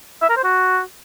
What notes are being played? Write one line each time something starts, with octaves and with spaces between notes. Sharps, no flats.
E5
A#4
C5
F#4